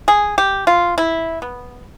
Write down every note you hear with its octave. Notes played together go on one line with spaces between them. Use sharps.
G#4
G4
F4
E4
B3